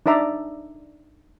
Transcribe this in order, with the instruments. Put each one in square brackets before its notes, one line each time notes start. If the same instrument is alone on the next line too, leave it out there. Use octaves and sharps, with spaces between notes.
[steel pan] D4 D#4 D5 E5 A#5